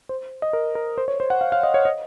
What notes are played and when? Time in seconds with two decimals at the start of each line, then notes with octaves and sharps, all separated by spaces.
0.09 C5
0.42 D#5
0.53 A#4
0.75 A#4
0.98 C5
1.08 C#5
1.20 C5
1.30 F#5
1.41 F5
1.52 F5
1.63 D#5
1.74 C#5
1.85 D#5